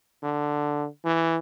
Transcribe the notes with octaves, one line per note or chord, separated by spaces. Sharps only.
D3
E3